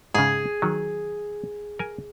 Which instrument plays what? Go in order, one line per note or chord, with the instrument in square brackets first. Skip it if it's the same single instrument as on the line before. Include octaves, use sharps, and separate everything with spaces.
[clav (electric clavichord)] G#2 C#3 [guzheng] G#4
[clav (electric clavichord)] D#3 F#3
A#4 G#5